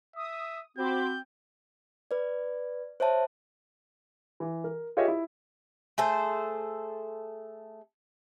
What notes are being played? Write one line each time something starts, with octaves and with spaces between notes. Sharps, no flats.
E5 D#6
C4 F#4 C5 B5 D6 G6
B4 D5
C5 C#5 E5 A5
E3
A#4
F4 G4 G#4 C#5 D#5 E5
E4
A3 G#4 A4 C5